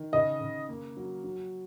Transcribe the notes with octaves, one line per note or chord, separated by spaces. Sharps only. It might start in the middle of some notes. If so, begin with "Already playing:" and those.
Already playing: D#3
C#3 D#5
C#3
A#3
F#3
F#3